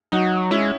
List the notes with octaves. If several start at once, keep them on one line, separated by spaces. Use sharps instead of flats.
F#3 D#4 F#4
G#3 C#4 E4